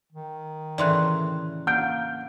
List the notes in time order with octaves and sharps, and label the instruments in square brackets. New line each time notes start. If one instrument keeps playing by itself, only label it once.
[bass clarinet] D#3
[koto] A2 C#3 E3 [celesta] D5 C6 F#6
[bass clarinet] A#3 [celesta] F#5 F6 D7 [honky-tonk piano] G6